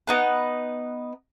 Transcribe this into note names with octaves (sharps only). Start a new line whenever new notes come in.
B3 D#4 B4